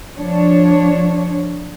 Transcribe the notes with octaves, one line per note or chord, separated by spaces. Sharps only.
F3 D4 C#5